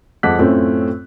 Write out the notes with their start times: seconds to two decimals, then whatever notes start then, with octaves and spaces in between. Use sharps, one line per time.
0.23 F2 G#3 F#5 D6 F#6 B6
0.39 F#2 A2 A3 C4 C#4 F4